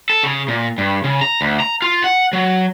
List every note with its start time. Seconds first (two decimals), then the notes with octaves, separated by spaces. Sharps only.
0.10 A4
0.23 C#3
0.48 A#2
0.78 G2
1.04 C#3
1.21 A#5
1.41 D2
1.60 A#5
1.82 F4
2.04 F#5
2.33 F#3